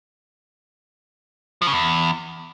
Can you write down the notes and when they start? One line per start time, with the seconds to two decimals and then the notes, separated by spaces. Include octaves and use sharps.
1.62 F3
1.67 C#3
1.73 E2